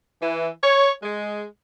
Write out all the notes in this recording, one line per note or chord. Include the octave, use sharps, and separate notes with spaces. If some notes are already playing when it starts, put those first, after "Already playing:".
E3
C#5
G#3